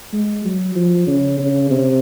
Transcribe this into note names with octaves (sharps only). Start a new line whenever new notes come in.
G#3
F#3
F3
C#3
C#3
C3